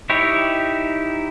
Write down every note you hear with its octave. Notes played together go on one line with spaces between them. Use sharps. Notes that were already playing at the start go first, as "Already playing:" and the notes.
D#4 E4 G4 C#5